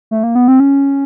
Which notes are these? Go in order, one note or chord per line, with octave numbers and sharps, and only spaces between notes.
A3
A#3
B3
C4
C#4